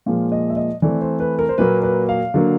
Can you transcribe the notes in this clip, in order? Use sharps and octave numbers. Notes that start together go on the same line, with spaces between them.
A#2 F3 G#3 F5
D#5
E5
D#5
E3 A3 C4 D5
C5
B4
A#4
C5
A#2 F#3 A#3 B4
B4
F5
D3 F#3 A#3